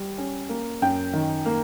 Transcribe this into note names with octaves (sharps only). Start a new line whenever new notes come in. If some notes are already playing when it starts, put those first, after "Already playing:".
Already playing: G3
C#4
A#3
F#2 G5
D#3
A#3